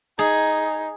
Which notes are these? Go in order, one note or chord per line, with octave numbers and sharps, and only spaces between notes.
D#4 G#4